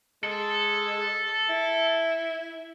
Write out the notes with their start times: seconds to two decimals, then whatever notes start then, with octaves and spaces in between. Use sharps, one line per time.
0.24 G#3 A4
1.49 E4